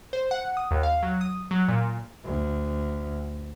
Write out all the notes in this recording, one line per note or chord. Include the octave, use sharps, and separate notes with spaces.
C5
F#5
D#6
D#2
F5
F#3
D#6
F#3
A#2
D2